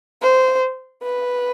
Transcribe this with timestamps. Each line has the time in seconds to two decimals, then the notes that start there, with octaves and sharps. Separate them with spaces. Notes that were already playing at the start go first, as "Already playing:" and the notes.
0.22 C5
1.03 B4